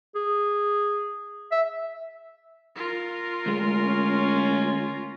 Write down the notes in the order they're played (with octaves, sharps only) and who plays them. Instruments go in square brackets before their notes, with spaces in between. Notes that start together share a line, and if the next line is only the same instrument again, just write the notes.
[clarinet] G#4
E5
[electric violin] F4 A#4
[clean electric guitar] D2 G#3
[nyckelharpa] C#4